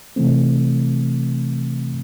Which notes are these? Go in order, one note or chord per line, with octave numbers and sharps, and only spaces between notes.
C3 E3 A3 C4